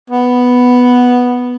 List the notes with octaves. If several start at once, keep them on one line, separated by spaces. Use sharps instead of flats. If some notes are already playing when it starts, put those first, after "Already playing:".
B3